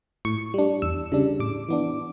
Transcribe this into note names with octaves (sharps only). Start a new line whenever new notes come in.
A2 C#6
G3 D4
E2 E6
C#3 G3 D4
A2 D6
E3 B3 D4